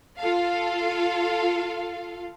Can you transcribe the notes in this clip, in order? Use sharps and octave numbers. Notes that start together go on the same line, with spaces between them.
F4 A4 F5